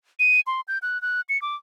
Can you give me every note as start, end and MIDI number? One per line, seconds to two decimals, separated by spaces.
0.19 0.40 99
0.47 0.61 84
0.68 0.78 91
0.82 1.00 90
1.02 1.21 90
1.29 1.40 97
1.42 1.55 86